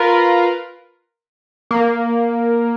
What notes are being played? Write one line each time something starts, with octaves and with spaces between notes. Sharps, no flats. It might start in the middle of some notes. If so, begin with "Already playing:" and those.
Already playing: F4 A#4 B4
A#3